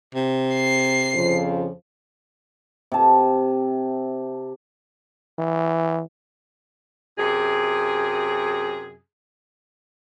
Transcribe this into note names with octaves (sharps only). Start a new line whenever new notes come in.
C3
C7
F2 C#3 F3
C3 A5
E3
F#2 C3 G#4